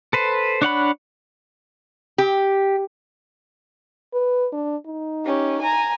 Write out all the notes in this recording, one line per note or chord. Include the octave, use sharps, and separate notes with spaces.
A4 B4 C5
D4 C#5 F#5 B5
G4
B4
D4
D#4
C#4 G4
G#5 A#5